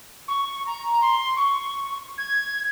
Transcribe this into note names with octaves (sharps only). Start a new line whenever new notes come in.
C#6
A#5
C6
C#6
G#6